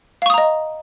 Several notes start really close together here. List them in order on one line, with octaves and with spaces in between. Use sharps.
F5 C#6 D#6 A#5 D#5